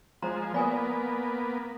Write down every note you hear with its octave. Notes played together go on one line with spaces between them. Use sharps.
F3 G#3 C5 A#5
A#3 B3 D5 G#5 D#6